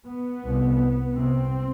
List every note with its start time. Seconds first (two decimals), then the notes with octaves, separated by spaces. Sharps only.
0.09 B3
0.46 C2 C3
1.18 C2 C3 C4